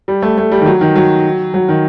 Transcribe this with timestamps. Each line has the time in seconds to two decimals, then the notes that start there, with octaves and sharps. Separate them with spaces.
0.08 G3
0.22 A3
0.38 A3
0.52 G3
0.61 D#3
0.66 F#3
0.81 D#3
0.96 F#3
1.54 F#3
1.69 D#3